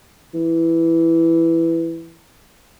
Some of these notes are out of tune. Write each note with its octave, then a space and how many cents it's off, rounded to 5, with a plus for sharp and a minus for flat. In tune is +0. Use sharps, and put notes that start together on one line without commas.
E3 +5